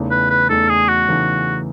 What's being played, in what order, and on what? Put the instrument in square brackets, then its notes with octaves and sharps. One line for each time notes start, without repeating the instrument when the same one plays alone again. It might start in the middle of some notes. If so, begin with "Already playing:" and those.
Already playing: [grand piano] E2 C#3 E3 A3 D#4
[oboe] B4
B4
[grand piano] E2 C#3 E3 A3 D#4 [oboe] A4
[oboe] G#4
F#4
[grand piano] E2 C#3 E3 A3 D#4